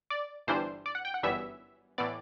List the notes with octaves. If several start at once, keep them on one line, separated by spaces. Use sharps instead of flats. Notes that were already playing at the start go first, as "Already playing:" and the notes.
D5
G1 G2 E3 G3 D4 C5
D5
F#5
G5
F#5
G1 F#2 E3 G3 B3 E5
A2 E3 B3 D5